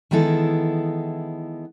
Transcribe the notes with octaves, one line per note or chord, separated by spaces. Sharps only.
D#3 E3 G#3 B3 E4 A4